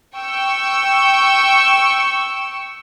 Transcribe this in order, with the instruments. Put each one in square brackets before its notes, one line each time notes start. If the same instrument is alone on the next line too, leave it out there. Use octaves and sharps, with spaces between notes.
[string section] G5 C#6 E6